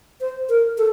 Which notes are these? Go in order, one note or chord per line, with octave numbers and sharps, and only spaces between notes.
C5
A#4
A4